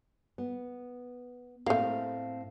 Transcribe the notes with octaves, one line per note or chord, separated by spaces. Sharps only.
B3
A2 A3 A#3 C4 F5